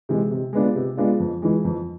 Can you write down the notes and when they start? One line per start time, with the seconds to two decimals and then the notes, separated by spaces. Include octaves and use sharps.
0.09 C3 E3 G#3
0.31 C3
0.53 G#3 B3 D4 F4
0.76 C3
0.97 G#3 B3 D4 F4
1.20 F2
1.42 E3 G#3
1.65 F2